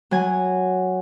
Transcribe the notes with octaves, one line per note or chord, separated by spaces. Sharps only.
F#3 G#5